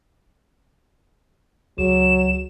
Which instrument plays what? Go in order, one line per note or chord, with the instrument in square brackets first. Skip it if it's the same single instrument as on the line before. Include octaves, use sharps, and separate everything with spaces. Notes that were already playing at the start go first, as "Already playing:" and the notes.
[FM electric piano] C#2 [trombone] F#3 [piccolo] E7